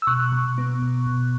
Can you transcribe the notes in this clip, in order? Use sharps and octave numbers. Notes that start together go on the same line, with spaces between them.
E6
B2 C#6 F#6
B2
B3
B2
B2